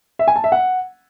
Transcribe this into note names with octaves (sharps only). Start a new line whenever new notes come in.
E5
G#5
A5
E5
F#5